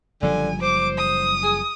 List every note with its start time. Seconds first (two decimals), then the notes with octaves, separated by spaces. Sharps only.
0.22 F#1 D3 F3 G3 G#5
0.62 C5 D6
0.98 D#6
1.43 G#4